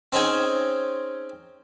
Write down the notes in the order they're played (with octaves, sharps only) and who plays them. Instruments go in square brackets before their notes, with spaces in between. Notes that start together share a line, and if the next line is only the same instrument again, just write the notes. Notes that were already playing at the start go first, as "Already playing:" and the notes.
[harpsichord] C4 C#4 D#4 G#4 G5 G#5